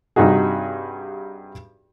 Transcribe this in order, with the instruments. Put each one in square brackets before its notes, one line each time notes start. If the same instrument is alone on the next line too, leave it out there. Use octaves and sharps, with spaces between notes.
[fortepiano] G2 C3 D#4 F#4 G#4